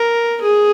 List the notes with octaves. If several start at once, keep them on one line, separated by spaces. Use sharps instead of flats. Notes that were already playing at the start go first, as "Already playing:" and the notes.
Already playing: A#4
G#4